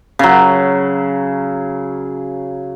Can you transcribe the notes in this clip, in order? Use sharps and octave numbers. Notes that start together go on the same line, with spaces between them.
C#3 F#3